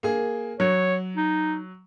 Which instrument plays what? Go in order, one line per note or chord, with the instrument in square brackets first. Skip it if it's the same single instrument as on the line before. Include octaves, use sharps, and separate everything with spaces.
[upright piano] A#3 G#4
[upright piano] F#3 [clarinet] C#5
[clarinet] D#4